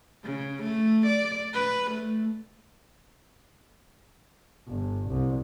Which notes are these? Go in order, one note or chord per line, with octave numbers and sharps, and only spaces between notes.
C#3
A3
D5
B4
A3
G1
C2